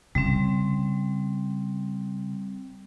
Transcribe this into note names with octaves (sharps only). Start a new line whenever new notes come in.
C#3 G3 C4